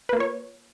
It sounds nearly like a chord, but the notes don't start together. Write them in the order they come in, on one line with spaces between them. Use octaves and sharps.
B4 A#3 F4 C#5